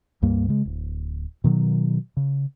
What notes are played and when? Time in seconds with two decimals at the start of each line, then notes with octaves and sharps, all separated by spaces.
0.22 C#2 G2 G3 A#3
0.48 C#3 G#3
0.65 D1
1.44 B2 D#3 F#3
2.17 C#3